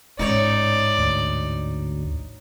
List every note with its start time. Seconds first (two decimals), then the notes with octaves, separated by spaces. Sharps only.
0.19 A1 G#2 D#4 C#5 D5
0.98 D2